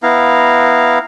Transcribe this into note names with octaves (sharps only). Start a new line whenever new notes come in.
B3 E4 F5 A#5